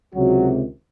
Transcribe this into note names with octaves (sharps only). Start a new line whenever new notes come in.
C#2 C3 D#3 F#3 G#3 F#4